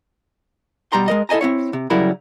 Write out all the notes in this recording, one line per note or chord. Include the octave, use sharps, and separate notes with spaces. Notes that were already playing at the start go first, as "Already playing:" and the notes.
B2 G3 G4 A#5 C6
G#3 A#4 D#5
E4 A4 D#5 G#5 A#5
C4 E4 C#5
C3
C#3 F#3 G3 E4 A#4 B5